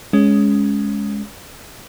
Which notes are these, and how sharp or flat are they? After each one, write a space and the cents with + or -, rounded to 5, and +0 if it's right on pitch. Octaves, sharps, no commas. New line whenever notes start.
G#3 +0 C#4 +10